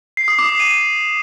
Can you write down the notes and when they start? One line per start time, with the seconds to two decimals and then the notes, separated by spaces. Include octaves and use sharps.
0.17 C7
0.28 D#6
0.39 D6
0.49 C7
0.60 D#7